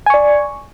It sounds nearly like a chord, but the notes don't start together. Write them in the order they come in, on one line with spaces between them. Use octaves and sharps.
G#5 C#6 D5